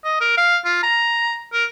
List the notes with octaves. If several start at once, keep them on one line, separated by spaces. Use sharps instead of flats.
D#5
A#4
F5
F4
A#5
A#4